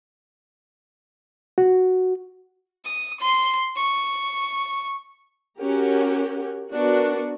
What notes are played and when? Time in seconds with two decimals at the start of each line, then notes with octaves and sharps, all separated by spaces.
1.58 F#4
2.85 D#6
3.20 C6
3.76 C#6
5.58 C#4 F#4 G4 A#4
6.72 B3 D4 F#4 A#4